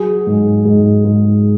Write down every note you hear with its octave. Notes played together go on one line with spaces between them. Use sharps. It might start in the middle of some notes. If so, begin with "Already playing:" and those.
Already playing: F#3 G#4
G#2
G#2
G#2